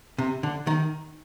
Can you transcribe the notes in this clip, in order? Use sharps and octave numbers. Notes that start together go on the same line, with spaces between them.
C3
D3
D#3